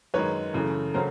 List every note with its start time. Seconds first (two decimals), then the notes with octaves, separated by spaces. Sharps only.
0.14 F#2 D#3 G#3 B4 C#5
0.54 F#2 C#3 E3 A3
0.94 C#3 F#3 A3 C#4 A#4 C5